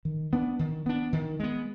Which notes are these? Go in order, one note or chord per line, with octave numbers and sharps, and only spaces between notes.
D#3
B3 D4
D#3
B3 D4
D#3
G#3 B3